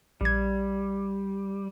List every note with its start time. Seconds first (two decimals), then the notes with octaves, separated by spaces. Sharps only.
0.21 A#1 G3 G#6